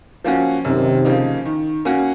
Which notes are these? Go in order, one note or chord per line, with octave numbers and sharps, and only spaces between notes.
F3 A#3 C#4 F#4
F#2 C3 D#3
C#3 F3 A#3 D#4
D#3
A#3 C#4 F#4